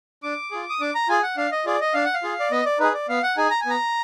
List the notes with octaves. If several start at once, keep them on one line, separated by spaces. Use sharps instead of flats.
D4 D6
F4 G#4
D#6
D4 D6
A#5
F4 G#4 G#5
F#5
D4 F5
D#5
F4 G#4 D5
D#5
D4 F5
F#5
F5
F4 G#4
D5
B3 D#5
D5
D#4 G#4 B4
D5
B3 F5
F#5
D#4 G#4 G#5
A#5
G#5
B3 A#5